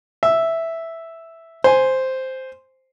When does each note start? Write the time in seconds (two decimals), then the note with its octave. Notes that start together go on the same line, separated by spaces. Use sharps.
0.23 E5
1.64 C5 G#5